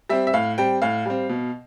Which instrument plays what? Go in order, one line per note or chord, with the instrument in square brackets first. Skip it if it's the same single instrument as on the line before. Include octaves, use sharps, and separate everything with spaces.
[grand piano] G3 C4 E5
E5
A2 F5
G3 C4 G5
A2 F5
G3 C4
B2